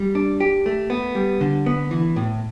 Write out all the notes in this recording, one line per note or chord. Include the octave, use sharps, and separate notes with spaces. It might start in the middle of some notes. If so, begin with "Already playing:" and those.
Already playing: G3
D4
G4
A3
B3
G3
D3
B3
E3
A2